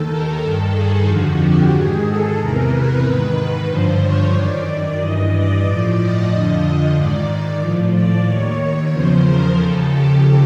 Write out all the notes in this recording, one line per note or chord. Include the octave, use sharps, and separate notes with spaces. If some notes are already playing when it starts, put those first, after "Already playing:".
Already playing: D#2 D#3 A4
A#4
G2 D#3 A4
G#4
F2 D3 F3 F#4
G4
G#2 D#3 G#4
A4
E2 C3 E3 A#4
B4
G#2 D#3
B4
G2 D3 F3 C5
C#5
F#2 D#3 D5
G2 E3 D#5
D5
A2 F3
D#5
F2 D3 F3
G#2 D#3 D5
D5
A2 F3
D5
D#2 D#3 C#5
E2 C#3 F3 C5
A#4
D#2 C#3 F3 A4
G4